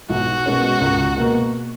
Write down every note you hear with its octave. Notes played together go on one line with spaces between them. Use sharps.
B1 F#4
B2 G#3 C#4
C#2
B2 A#3